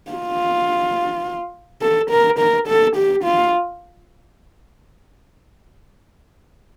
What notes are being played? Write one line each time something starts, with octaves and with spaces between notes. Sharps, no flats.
F4
A4
A#4
A#4
A4
G4
F4